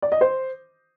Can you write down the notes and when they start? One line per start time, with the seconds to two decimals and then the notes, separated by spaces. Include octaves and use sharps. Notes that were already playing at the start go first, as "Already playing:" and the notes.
0.02 D5
0.12 D#5
0.21 C5